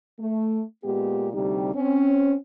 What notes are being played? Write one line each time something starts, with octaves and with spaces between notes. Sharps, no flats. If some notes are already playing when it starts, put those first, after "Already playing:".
A3
A#2 G#3 B3 G4
D2 C3 G3 C4 D#4 G4
C4 C#4